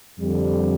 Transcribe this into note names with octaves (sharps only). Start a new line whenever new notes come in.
F2 D3 G3